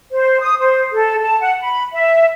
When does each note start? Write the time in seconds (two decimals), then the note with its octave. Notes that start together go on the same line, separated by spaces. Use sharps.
0.12 C5
0.41 D#6
0.60 C5
0.93 A4
1.22 A5
1.41 F#5
1.62 B5
1.93 E5